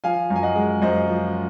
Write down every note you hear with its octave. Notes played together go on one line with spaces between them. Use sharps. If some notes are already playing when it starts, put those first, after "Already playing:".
F3 F5 G#5
F#2
G#5
D#5 F#5
G#3
F#2 C5 D#5
F3